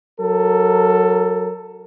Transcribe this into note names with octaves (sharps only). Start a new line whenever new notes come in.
F#3 A4 A#4